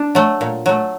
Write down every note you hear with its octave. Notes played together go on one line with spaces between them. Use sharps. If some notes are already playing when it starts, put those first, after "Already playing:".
Already playing: D4
F#3 A3
A#2
F#3 A3